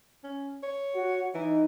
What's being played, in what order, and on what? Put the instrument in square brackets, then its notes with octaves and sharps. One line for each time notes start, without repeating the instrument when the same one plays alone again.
[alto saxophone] C#4
C#5
[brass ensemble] F#4
[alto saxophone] E3 [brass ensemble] D#4